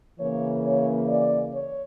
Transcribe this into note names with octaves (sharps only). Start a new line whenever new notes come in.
C#3 E3 A#3 C#5
C#5
D5
C#5